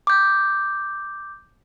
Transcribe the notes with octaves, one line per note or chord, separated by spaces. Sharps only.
D6 G6